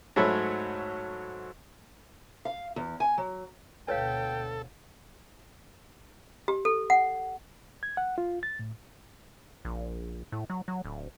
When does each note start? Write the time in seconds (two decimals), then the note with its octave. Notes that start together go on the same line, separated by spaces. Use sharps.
0.16 G#2 F#3 A3 C#5 E5 B5
2.45 F5
2.76 E2
3.00 G#5
3.18 F#3
3.88 D2 B2 A4 B4 C#5 F5 G5
6.48 G4
6.65 A4
6.90 F#5
7.83 G#6
7.97 F#5
8.18 F4
8.43 A6
8.59 A2
9.65 A#1
10.32 A2
10.50 F#3
10.68 F#3
10.85 D1